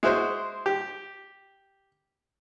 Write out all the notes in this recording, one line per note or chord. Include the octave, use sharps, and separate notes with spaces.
G#3 E4 F#4 C5
G4